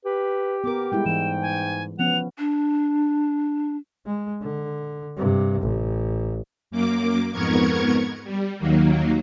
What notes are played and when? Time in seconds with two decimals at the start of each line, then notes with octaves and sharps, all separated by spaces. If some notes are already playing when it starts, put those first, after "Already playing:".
0.05 G4 B4
0.64 B3 A#4 D6
0.92 G3 G#3 E4 G5
1.06 G#2 E3 E7
1.42 G#5
1.99 F3 B3 C#4 F#5 F7
2.37 D4
4.06 G#3
4.42 D3
5.17 G2 C3
5.61 A1
6.71 F#2 A#3 D6
7.32 F2 G#2 B3 A#4 C#6 G#6
8.24 G3
8.58 D#2 D#3 F#3 A#3